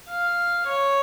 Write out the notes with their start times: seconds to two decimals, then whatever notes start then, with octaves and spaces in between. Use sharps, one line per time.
0.09 F5
0.66 C#5